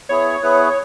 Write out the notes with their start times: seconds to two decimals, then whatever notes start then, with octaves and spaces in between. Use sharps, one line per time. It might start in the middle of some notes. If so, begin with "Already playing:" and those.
0.09 B3 E4 G#4 C#5
0.42 B3 E4 G#4 B4